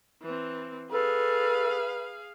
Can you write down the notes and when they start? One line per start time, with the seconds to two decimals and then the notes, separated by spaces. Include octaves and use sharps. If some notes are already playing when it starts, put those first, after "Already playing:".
0.22 E3 C4
0.91 G#4 A4 B4 F5